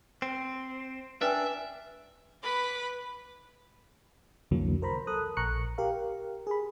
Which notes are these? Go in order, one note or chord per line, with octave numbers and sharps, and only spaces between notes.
C4
D4 B4 E5 G5 G#5
B4 B5 D6
C2 F2 D3 E3 F#3 A#3
A#4 C5 A#5 B5
A4 A#4 D#6 F#6
A#1 A#5 C#6 F#6 C#7
G4 A#4 F5
G#4 B5